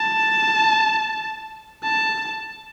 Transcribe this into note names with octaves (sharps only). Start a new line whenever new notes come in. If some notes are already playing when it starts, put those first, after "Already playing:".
Already playing: A5
A5